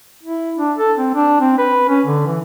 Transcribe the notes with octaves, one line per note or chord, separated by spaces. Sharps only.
E4
D4
A4
C4
D4
C4
B4
C#4
D3
E3